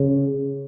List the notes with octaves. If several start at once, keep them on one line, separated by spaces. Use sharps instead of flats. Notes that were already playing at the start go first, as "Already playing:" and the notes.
Already playing: C#3